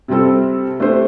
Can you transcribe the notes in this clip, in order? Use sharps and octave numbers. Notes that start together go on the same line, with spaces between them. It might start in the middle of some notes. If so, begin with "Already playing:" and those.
C3 G3 C4 A4
A3 D4 G4 C5